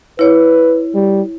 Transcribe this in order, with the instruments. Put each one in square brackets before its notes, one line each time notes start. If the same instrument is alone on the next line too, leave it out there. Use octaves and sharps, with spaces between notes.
[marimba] E4 C#5 [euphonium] B4
[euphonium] G3